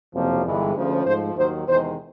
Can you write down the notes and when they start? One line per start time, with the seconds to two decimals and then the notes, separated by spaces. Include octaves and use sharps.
0.13 F#1 F2 C3 F3 A#3
0.45 G1 G2 E3 G#3
0.75 D2 C#3 F3
1.05 G#2 F3 A3 C5
1.36 D#2 D#3 F#3 C5
1.67 E2 C3 D#3 G#3 C5